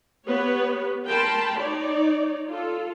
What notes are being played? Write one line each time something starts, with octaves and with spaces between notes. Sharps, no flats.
B3 G4 B4 C#5
A#4 G5 A5 B5 C6
D#4 C#5 D5
F4 A4